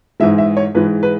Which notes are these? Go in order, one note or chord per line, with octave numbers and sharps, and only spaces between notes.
G#2 E3 G#3 E5
E5
C#5
G#2 E3 G#3 B4
B4